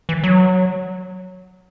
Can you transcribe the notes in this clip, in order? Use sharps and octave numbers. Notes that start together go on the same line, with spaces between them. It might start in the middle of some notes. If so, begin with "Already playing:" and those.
E3
F#3